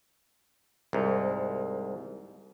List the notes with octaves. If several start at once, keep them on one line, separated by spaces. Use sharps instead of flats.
C2 G#2